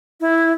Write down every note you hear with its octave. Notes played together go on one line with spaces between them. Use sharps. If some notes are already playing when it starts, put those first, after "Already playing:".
E4